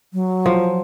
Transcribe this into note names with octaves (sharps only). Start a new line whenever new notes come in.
F#3
F3